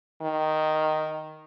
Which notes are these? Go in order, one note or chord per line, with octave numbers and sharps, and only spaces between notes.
D#3